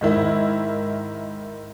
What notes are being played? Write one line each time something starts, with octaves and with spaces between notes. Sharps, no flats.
G#2 D#3 E4